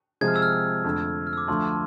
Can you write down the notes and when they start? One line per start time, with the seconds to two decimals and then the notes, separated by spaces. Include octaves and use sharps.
0.21 C3 F3 G#3 C4 G#4 G#6
0.28 F6
0.36 E6
0.42 F6
0.53 F6
0.84 F2 D3 A3
1.27 F6
1.33 E6
1.38 D6
1.48 D2 D3 F3 A3 C6
1.63 A5